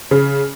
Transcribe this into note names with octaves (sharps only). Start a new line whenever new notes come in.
C#3